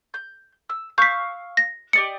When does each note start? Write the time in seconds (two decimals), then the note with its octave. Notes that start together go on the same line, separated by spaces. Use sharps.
0.14 G6
0.69 E6
0.98 F5 C#6 E6 G6 B6
1.57 A#6
1.93 G4 D5 D#5 C#7